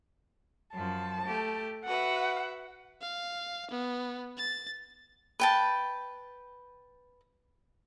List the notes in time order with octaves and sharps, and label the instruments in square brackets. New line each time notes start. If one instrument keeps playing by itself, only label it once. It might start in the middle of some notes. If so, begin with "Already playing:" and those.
[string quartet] F#2 F3 [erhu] A5
[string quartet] A3 G4
[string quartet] F#4 B4 E5 [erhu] F#5
[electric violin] F5
B3
A6
[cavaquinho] B4 G5 A5